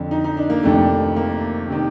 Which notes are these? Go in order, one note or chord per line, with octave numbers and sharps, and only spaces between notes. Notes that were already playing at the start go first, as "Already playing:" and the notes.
Already playing: F2 D3
D#4
D#4
D4
A#3
F2 C3 D#3 A3
A#3
C3 D#3